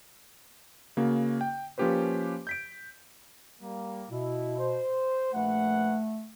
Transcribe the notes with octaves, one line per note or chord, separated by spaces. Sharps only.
C#3 A#3 F#4
G5
F3 A#3 C#4 G4 B4 C5
G6 B6 D7
G3 A#3
B2 E4
C5
A#1 A3 B4 F#5